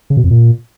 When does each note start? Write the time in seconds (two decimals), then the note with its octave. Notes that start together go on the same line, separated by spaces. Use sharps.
0.10 C#3
0.17 B2
0.24 F2
0.31 A#2